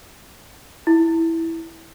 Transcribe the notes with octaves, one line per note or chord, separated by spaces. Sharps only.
E4